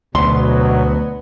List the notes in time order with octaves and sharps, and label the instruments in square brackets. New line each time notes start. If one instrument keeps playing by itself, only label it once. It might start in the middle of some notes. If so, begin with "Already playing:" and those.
[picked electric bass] D2 [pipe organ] B2 F#3 [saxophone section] B3 [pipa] C6